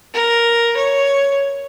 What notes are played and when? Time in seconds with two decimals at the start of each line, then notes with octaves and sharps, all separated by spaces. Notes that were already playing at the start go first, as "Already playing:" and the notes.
0.14 A#4
0.77 C#5